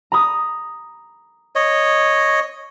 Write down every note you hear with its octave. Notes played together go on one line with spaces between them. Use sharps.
A#5 B5 D#6
C#5 D#5